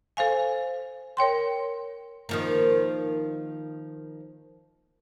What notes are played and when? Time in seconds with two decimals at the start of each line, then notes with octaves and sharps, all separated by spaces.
0.17 A4 C5 F5 G#5
1.17 A#4 C#5 G5 C6
2.29 D#3 F3 A#3